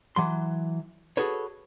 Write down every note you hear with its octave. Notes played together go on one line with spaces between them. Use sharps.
E3 F#3 C6
F#4 G#4 A4 B4 C#5